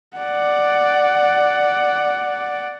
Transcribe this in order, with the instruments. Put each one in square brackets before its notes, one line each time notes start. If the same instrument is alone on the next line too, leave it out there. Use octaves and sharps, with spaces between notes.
[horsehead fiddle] D5 F#5